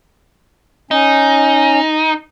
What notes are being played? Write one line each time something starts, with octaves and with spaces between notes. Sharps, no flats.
C#4 D#4